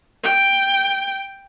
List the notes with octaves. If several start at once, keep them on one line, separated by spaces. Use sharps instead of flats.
G5